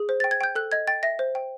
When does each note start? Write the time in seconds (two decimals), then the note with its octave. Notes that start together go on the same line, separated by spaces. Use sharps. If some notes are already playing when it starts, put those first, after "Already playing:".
Already playing: G#4
0.09 C5
0.20 G5 A6
0.31 G#6
0.41 G5 G6
0.55 A4 F#6
0.72 D#5 G#6
0.87 G5 A6
1.03 E5 A#6
1.19 C5
1.35 G5